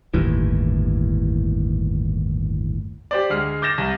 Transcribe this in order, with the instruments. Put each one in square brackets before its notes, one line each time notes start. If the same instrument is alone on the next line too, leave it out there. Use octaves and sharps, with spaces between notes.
[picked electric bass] G1 D#2 A2 E3
[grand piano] G4 C5 D5
D2 G#3 F6 C7
D6 G6 A6 A#6 E7
C2